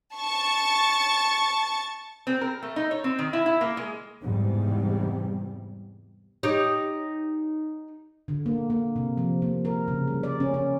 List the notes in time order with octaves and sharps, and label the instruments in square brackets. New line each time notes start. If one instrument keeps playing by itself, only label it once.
[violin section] A5 C#6 A6
[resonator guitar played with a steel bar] C4
A#4
A3
D#4
C#5
C4
D#3
E4
E4
A#3
G#3
[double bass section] E2 G#2 C3 G3
[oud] D#4 G4 C#5
[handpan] D3
A#3
A#3
C3
F3
A#3
A#4
C#3
G3
D5
C#4
C#4